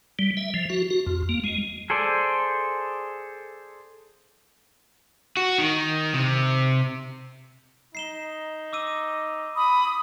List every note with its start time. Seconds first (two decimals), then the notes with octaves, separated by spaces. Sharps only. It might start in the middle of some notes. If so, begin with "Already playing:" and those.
0.19 G3
0.37 E5
0.54 F3
0.70 F#4
0.90 F#4
1.07 F2
1.29 A#3
1.44 G#3
1.90 G#4 A4 C5 D5
5.37 F#4
5.58 D#3
6.14 C3
7.95 D#4 C7 E7 G7
8.73 D6 E6 D#7
9.56 B5 D#6